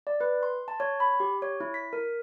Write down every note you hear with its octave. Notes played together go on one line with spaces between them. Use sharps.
D5
B4
C6
A5
C#5
B5
G4
C#5
E4
B6
A#4